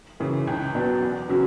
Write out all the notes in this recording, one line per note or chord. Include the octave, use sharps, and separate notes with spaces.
F#2 C#3 E3
C#2
B2 F#3 B3 D4
E2
C#3 F#3 C#4 F#4